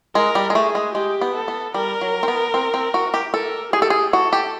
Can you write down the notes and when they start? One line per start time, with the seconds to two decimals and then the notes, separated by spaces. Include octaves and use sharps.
0.15 G#3 A#4
0.35 G3
0.50 G#3
0.55 A3 G#4
0.75 G#3
0.95 G#3 G4
1.21 B3
1.35 A4
1.48 B3
1.74 G3 A#4
2.01 F#3
2.23 C4
2.28 B3
2.54 C4
2.74 C4
2.94 F#4
3.14 G4
3.33 A4 A#4
3.73 G4 G#4
3.82 A4
3.90 G#4
4.13 F#4 A4
4.33 G4